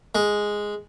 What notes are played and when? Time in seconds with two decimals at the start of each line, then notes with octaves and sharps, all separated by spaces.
0.15 G#3